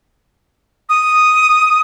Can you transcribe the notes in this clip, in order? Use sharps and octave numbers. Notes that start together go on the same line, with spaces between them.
D#6